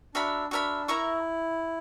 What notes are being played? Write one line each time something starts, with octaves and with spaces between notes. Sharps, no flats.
D4 F#4 A#4 E5 B5
D4 F#4 A#4 E5 B5
E4 A#4 E5 A#5 C#6